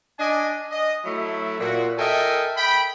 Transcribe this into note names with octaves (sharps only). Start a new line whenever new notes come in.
D4 D#5 G#5
D#5
F#3 A3 E4
A#2 F#4
A4 A#4 D#5 E5 G5 G#5
G5 B5